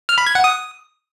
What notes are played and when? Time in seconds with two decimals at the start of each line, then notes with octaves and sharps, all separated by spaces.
0.09 F6
0.18 B5
0.26 G#6
0.35 F#5
0.44 D#6